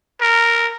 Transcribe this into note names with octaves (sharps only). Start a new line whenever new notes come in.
A#4